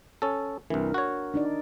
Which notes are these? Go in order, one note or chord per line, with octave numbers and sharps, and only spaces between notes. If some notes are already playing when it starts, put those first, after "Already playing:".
C#4 A4
C2 E3 D4 A#4
F#4 C#5
D4 D#4 D5